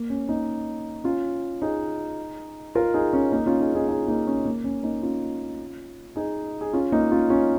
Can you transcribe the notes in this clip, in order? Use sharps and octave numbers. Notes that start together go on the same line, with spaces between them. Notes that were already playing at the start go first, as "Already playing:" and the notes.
Already playing: A#3
C#4
A#3 D#4
C#4 F4
D#4 G#4
F4 A#4
D#4 G#4
C#4
A#3 D#4
C#4 F4
D#4 G#4
D#4 G#4
D#4 G#4
A#3 D#4
C#4
A#3
C#4
A#3 D#4
C#4 F4
D#4 G#4
G#4
C#4 F4
A#3 D#4
C#4 F4
C#4 F4